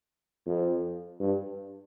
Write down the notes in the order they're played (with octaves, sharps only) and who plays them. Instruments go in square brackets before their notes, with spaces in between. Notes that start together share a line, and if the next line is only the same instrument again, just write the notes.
[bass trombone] F2
G2